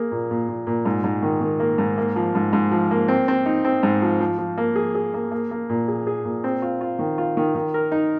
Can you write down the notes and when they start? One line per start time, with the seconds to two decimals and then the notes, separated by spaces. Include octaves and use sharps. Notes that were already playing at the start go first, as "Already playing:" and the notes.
Already playing: A#3 G#4
0.12 A#2
0.31 A#2
0.48 A#2
0.67 A#2
0.85 G#2
1.04 G#2
1.23 D#3
1.41 D#3
1.60 A#3
1.78 G#2
1.98 A#3
2.16 F3
2.35 G#2
2.53 G#2
2.72 F3
2.91 A#3
3.08 C4
3.28 C4
3.46 D#4
3.65 C4
3.83 G#2
4.02 F3
4.21 F3
4.38 F3
4.58 A#3
4.76 G#4
4.95 G#4
5.14 A#3
5.32 A#3
5.51 A#3
5.69 A#2
5.88 G#4
6.07 G#4
6.25 A#2
6.44 C4
6.62 F4
6.81 F4
6.99 D#3
7.18 F4
7.37 D#3
7.55 D#3
7.74 A#4
7.92 D#4